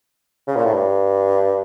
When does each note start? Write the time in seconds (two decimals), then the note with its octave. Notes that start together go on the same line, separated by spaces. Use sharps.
0.48 C#3
0.56 A#2
0.65 A2
0.74 G2